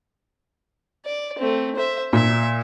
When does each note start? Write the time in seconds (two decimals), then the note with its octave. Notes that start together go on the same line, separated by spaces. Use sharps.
1.06 D5
1.39 A3 C4
1.76 C5 E5
2.13 A#2 E5